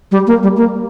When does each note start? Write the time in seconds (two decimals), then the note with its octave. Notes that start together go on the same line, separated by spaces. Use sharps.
0.12 G3
0.27 A#3
0.43 G3
0.57 A#3